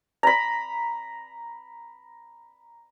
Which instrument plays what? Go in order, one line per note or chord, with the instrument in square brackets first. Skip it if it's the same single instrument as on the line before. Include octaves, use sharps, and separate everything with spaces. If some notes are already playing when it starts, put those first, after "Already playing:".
[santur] A#5 B5